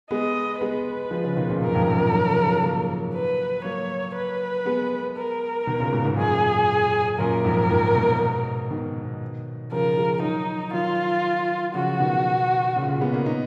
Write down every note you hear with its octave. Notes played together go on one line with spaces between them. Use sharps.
G#3 B3 D#5
G#3 B3 B4
F3 G#3
C#3 F3
B2 D#3
A#2 C#3
F#2 A#4
F2 G#2
F#2
F2 G#2
D#3 F#3
C#3 F3
C#3 F3
D#3 F#3
F#3 A#3
B4
F#3 A#3 C#5
B4
G#3 B3
A#4
B2 D#3
A#2 C#3
G#2 B2
G#2 B2
F#2 A#2 G#4
F#2 A#2 A#4
F2 G#2
F2 G#2
G#2 B2
B2 D#3
C#3 F3 A#4
F3 G#3
D#3 F#3 D#4
D#3 F#3 F4
C#3 F3 F#4
B2 D#3
A#2 C#3
A#2 C#3
G#3 B3
A#3 C#4
B3 D#4